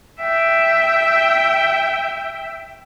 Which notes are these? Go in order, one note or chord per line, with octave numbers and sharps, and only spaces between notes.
E5 G5